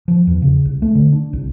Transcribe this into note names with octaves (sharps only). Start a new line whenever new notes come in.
F3
E2
C#3
C2
A3
D3
D4
C2